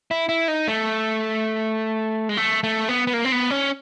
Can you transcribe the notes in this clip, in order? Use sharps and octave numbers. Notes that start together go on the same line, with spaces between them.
E4
E4
D#4
A3
G#3
A3
A3
B3
B3
A#3
C4
B3
C#4